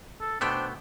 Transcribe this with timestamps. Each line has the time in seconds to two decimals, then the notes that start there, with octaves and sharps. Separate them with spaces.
0.21 A4
0.41 B2 A3 B3 D4 C5 G5